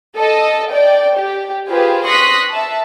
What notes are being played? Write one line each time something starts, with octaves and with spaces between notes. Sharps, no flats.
A4 D#5
D5 G5
G4
F4 G4 G#4 B4 C5
C6 C#6 D#6 F#6 A#6 B6
E5 A5